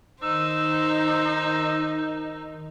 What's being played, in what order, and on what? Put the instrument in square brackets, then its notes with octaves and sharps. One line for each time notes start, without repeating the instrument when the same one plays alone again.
[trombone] D#3 [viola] D#4 [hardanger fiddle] C5 [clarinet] E6